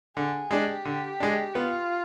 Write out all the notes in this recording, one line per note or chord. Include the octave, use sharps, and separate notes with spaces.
D3 G#4
G#3 D4 G4
D3
G#3 D4
B3 F4